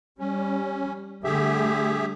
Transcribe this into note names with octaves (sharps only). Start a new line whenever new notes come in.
G3 C#4
D3 G3 A3 G4 G#4 E5